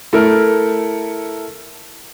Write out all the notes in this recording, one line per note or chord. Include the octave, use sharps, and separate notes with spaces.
A3 E4 A4 A#4